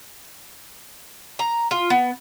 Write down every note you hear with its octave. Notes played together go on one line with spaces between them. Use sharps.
A#5
F4
B3